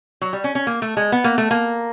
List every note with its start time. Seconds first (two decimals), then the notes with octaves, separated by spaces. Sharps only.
0.21 F#3
0.33 G3
0.44 C#4
0.55 C#4
0.67 A#3
0.82 A3
0.97 G#3
1.12 B3
1.24 A#3
1.38 A3
1.51 A#3